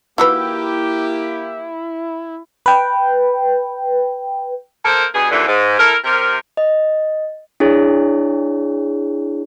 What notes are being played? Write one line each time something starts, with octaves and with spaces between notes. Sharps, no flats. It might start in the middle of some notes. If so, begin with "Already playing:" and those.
D#3 A#3 E4 F#4 G4 B4 E6
B4 G5
A#3 A4 A#4 C5
G2 B2 G#4
D#2 A#2 D3 E3
G#2
E4 A4 A#4
C3 A#4
D#5
D4 E4 G#4 C#5